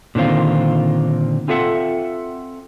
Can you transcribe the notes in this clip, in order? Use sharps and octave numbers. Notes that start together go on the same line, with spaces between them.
A#2 D3 D#3 C4 F4
C4 F4 A4 E5 F#5